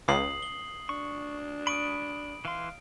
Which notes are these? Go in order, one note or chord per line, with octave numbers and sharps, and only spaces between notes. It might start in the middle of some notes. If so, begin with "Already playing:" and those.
C#2 D#6 C7 F#7
G7
D4 C#6
B5 C#6 D#6 D7
E3 F5 C6